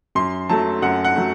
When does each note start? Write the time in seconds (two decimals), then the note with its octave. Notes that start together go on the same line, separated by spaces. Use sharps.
0.15 F#2 C6
0.49 F#3 A3 A5
0.82 F#2 F#5
1.04 F#5
1.16 F#3 A3